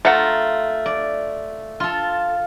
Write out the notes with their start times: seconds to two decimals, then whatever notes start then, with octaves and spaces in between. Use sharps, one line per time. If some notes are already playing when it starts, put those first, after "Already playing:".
0.05 A3 F4 F#5 A#5
0.86 D5
1.80 F4 A4